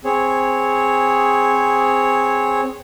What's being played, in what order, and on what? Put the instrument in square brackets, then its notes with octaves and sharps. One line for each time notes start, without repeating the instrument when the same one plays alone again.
[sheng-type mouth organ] C4 G#4 C#5